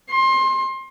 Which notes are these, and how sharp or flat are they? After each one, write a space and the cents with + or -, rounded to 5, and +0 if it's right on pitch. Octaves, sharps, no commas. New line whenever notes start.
C6 +25